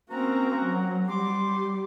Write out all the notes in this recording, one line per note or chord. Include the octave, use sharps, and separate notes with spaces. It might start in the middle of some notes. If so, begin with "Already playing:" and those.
A#3 C4 C#4 F#4 A#5
F#3
G3 C6 D6